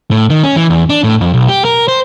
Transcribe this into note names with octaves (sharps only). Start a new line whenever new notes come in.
A2
D#3
C#4
E3
E2
D4
A2
F2
B1
G4
A#4
C5